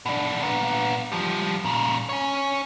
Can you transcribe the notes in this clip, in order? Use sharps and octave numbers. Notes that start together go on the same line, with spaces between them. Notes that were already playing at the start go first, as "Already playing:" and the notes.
B2 D4
A#2 B3
F3 G3
A#2 C#3
C#5 G#5